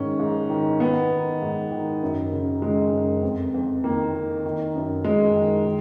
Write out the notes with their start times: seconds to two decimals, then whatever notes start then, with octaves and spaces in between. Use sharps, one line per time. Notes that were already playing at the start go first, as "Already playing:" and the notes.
Already playing: G#2 D#3 C#4
0.20 G#2
0.50 D#3
0.80 D#3 B3
1.11 D#3
1.42 G#2
1.71 D#3
2.03 F#2
2.32 C#3
2.62 C#3 G#3
2.92 F#2
3.23 F2
3.54 F2
3.84 D#3 A#3
4.14 D#3
4.45 D#3
4.75 F#2
5.04 F#2 G#3
5.35 D#3
5.66 D#3